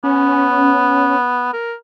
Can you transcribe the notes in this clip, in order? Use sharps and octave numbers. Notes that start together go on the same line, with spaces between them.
B3 C#4
A#4